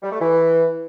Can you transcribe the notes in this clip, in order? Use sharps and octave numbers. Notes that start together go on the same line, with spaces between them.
G3
A3
E3